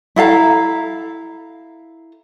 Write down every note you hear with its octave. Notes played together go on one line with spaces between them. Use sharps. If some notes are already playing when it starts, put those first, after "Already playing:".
E4 A4 F5 A#5